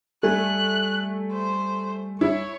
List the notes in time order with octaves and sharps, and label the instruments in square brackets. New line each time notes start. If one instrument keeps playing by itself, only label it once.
[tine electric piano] G3 G#5 [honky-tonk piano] A3 [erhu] F#6
[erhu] C5
[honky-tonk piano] E4 [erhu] C#5